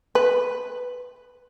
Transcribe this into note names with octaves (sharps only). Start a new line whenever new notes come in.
B4